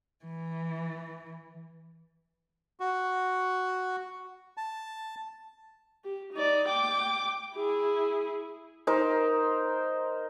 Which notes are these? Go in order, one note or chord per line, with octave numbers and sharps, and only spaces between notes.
E3
F#4
A5
G4
D#4 D5
G5 D6
E4 G#4
D#4 A#4 C5